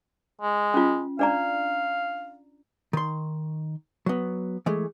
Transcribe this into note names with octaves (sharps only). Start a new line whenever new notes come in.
G#3
C#4 F4
D4 D5 F5 A#5
D#3 C6
F#3 B3
E3 G#3 A3